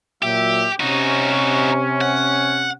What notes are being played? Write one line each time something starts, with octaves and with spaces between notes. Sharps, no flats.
A#2 F#3 G4 E5
C3 C#4 D#4 F#4
F#5